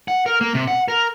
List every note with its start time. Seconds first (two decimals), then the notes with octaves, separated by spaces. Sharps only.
0.08 F#5
0.26 A#4
0.41 A#3
0.54 C3
0.68 F#5
0.88 A#4